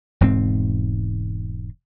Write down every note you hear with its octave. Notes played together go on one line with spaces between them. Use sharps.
E1 G#2 C4